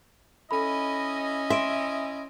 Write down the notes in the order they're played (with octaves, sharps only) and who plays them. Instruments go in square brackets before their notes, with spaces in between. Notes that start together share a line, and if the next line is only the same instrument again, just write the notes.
[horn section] C#4 E4 D#5 [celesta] A4 B5
[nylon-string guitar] E5 [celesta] C6 D7